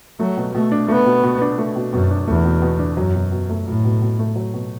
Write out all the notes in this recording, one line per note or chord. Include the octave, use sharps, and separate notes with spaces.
F#3 A3
B2
B2 A3
D4
A3 B3
B2
B2
D4
A3
B2
F#2 B2
D4
E2 A3
B2
B2
D4
F#2 F#3
B2
B2
A3
A2 F#3
B2
B2
A3
F#3
B2